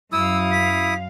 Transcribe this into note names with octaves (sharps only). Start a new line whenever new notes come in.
F#2 E4 F5 D#6 E6
B6